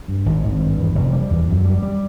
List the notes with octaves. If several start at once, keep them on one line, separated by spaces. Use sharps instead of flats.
G2
G#1
G#1
G2
E2
F1
G3
E2
F#2
G3
G3